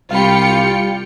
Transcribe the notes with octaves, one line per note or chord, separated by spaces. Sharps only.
C2 G3 F4 F5 G5 B5 C#7